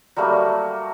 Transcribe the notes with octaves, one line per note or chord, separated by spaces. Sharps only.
F#3 G3 A3 A#3